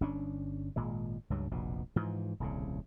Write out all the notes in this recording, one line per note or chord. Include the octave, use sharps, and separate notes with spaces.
G1 C#4 D4
G#1 A#2 G#3
C#2 G2 F#3
F1 A#1 B2
G#2 E3 F3
D#1 C2 C#3